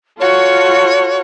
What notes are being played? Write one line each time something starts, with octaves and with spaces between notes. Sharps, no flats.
F4 F#4 A4 C#5